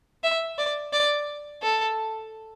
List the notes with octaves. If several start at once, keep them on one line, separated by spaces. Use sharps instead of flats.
E5
D5
D5
A4